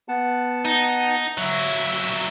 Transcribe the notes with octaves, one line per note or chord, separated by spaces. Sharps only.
B3 F#5 A5
D#4
F#3 E4 E5